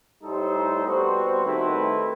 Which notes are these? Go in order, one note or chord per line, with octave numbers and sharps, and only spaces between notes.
A2 G3 D#4 A4 C5
B2 G3 C4 F#4 C5
D#3 A3 C4 E4 B4